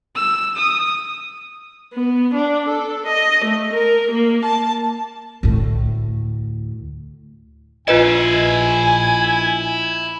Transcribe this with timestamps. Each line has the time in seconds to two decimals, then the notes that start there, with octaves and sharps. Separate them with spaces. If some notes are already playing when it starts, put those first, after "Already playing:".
0.16 E6
0.57 D#6
1.93 B3
2.34 D4
2.69 A4
3.06 D#5
3.45 A3
3.73 A#4
4.11 A#3
4.44 A5
5.43 D2 A2
7.88 A#1 E4 F4 B4 D#5 F5 G#5